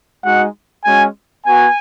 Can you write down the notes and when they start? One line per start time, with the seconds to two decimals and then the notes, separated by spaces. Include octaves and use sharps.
0.24 G#3 D#4 F#4 F#5
0.84 G#3 C#4 F#4 G#5
1.45 B3 F#4 G#5